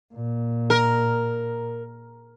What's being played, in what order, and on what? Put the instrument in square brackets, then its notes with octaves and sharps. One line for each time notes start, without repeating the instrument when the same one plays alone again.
[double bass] A#2
[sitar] A#4